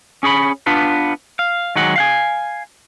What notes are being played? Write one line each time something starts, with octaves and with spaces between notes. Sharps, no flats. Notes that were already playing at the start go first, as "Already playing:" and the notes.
C#4 G#4 C#5 B5
B3 D4 F4 B4
F5
D#3 F#3 G#3 F#5
F5 F#5 G#5